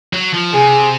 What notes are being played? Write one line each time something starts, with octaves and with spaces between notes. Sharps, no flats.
F#3
F3
C3 G#4